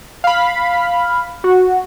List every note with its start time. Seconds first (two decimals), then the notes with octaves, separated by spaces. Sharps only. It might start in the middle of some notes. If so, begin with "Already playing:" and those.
0.24 F5 B5
1.44 F#4